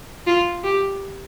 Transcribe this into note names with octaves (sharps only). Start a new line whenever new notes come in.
F4
G4